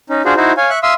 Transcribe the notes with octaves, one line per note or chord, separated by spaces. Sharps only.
C#4 D#4
D4 F4 F#4 G#4 C5
D#4 E4 F#4 C5
C#5 F5 G#5
E5 C#6 F#6
E5 F5 C6 D#6 E6